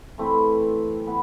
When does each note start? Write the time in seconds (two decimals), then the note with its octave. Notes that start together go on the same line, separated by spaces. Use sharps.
0.18 E3 A3 C4 E4
1.07 E3 B3